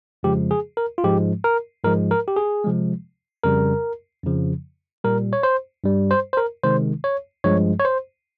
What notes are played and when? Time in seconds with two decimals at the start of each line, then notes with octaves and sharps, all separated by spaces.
0.23 F2 C#3 F3 G#3 G4
0.51 G#4
0.77 A#4
0.98 F4
1.04 G#2 F3 G#3 G4
1.44 A#4
1.84 G#2 F3 G#3 A#4
2.11 A#4
2.28 G4
2.37 G#4
2.64 C3 F3 G#3
3.44 F2 C#3 G3 A#4
4.24 F2 C#3 F3
5.04 A#2 G3 A#4
5.33 C#5
5.43 C5
5.84 G2 G3
6.11 C5
6.33 C5
6.37 A#4
6.63 C3 D#3 G#3 C5
7.04 C#5
7.44 G2 F3 G#3 C#5
7.80 C#5
7.85 C5